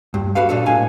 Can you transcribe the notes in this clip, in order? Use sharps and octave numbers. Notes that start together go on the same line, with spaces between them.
G2
F#4 G4 A4 B4 F5
A#2 F#3 D4 D#4 A4
A2 F5 G#5